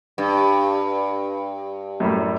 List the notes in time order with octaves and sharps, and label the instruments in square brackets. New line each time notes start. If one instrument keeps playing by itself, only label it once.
[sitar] G2
[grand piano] F#2 A2 G3